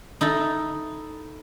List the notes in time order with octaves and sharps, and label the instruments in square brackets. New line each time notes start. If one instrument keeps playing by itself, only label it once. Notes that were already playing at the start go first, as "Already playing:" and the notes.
[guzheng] D#4 E4 A4